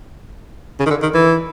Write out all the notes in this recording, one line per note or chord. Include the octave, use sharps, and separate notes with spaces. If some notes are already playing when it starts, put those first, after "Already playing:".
C#3
D#3
D3
D#3
E3